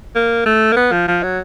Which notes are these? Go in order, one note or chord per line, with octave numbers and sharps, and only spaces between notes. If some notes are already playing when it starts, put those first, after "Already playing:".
A#3
A3
A#3
B3
F3
F3
F#3